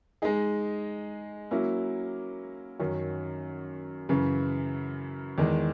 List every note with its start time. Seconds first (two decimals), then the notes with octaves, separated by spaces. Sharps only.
0.22 G#3 D#4 G#4
1.51 F#3 A#3 C#4 E4
2.80 F#2 D#3 F#3 C#4
4.09 F#2 C#3 E3
5.38 E2 D#3 G#3